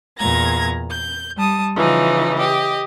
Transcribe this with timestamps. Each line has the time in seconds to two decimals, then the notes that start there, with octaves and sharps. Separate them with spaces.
0.17 E2 A#2 A#5 G#6 A#6
0.89 G6
1.36 G3 A5 D#6
1.76 C#3 E3 F3 D#4
2.37 G4 D#5